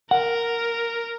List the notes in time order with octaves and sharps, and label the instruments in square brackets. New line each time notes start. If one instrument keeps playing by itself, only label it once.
[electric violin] A#4 [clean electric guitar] F#5